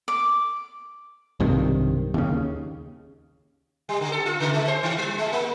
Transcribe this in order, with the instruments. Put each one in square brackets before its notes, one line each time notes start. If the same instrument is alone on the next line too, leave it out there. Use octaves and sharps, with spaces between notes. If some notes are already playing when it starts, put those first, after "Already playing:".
[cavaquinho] D6
[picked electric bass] B1 G2 C3 D#3
D#2 C#3
[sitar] G3
D3
A4
F4
C#3
G#3
C5
D#3
G3
G#3
A#3